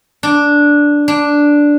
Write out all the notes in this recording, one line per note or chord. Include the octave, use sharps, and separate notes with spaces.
D4
D4